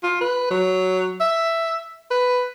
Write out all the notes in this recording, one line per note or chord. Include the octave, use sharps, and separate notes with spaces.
F4
B4
F#3
E5
B4